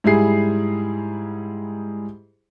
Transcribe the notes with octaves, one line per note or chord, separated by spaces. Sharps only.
G#2 G3 E4 G#4 C7